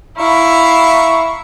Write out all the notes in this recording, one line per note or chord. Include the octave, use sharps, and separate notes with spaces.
E4 F5 A#5 C#6